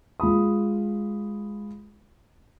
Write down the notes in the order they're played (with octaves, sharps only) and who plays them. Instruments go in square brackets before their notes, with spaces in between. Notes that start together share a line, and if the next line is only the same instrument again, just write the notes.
[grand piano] G#3 F4 B5 D#6